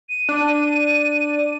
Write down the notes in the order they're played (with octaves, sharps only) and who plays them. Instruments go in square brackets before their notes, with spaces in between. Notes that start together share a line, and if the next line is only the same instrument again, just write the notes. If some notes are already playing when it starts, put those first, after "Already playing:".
[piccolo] D#7
[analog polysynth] D4